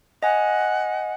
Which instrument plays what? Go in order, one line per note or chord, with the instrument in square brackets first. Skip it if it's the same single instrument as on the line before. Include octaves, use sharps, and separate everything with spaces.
[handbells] D#5 G#5 [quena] F#5